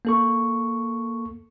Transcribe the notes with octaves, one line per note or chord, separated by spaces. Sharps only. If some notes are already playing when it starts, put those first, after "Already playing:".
A#3 A4 C#6